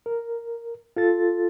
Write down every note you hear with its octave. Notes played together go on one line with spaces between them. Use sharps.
A#4
F4 A4 A6